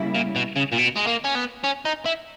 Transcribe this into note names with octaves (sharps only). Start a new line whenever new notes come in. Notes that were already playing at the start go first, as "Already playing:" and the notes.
Already playing: C#3 G3 A#3 E4
A#2
B2
C#3
A#2
B2
G#3
A#3
C#4
B3
C#4
D#4
E4